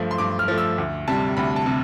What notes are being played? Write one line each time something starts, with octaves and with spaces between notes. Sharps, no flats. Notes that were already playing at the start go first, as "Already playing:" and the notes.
Already playing: G2 F3 A3
C6
G2 D6
F6
F3 A3
E6
D2
C3 G3 A5
D2 B5
A5
C3